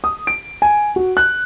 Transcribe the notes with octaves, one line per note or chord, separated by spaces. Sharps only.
D#6
D7
G#5
F#4
F#6